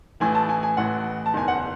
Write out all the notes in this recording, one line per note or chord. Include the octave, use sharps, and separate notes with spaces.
A1 A2 E3 G#5
A5
G#5
G#5
A1 A2 E3 F#5
A5
F#1 E2 D#3 G#5
F#5